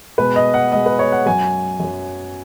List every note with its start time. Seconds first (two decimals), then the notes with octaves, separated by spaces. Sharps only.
0.18 B2 G#3 B4
0.36 D#5
0.54 F#5
0.72 B2 G#3 D#5
0.86 B4
0.99 C#5
1.12 F#5
1.26 F#2 F#3 G#5
1.80 F#2 F#3